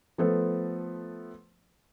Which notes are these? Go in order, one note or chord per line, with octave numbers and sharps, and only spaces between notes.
F3 A3 B3 A4 C5